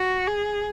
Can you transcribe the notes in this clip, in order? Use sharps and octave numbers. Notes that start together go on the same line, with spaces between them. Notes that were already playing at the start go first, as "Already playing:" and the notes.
Already playing: F#4
G#4